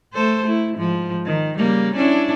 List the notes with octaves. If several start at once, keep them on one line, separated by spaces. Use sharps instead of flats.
A3 A4 C5
A3 E4
G#2 F3
D#3
C#3 G3 A#3
C#4 D4 E4